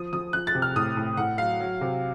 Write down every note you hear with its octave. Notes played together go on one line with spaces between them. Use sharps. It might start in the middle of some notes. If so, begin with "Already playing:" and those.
Already playing: F3 D#6
F3 D#6
F3 F#6
A6
C3
F6
A2 D#6
A2
A2 F#5
F#3 F5
F#3
C3